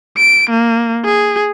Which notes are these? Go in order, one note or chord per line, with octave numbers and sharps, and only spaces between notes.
D7
A#3
G#4